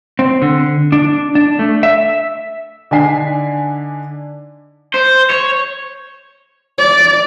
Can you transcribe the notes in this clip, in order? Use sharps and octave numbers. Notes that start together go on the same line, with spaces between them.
C4
D3
D4
D4
A3
E5
D3 D4 D#4 G#5 B6 C7
C5
C#5
D5